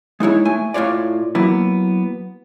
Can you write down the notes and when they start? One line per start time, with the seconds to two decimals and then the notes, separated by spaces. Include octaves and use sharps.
0.20 G#3 D#4 E4 C#5
0.45 A3 G#5
0.74 A2 F4 C#5 D5
1.35 F#3 A#3 B3 E4